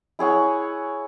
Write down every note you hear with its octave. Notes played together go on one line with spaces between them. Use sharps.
E4 G#4 C#5 F#5